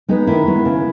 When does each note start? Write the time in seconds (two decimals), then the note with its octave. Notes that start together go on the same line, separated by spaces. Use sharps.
0.09 G#3 B3 D#4
0.27 D#3 E4
0.47 G#3 B3
0.65 C#3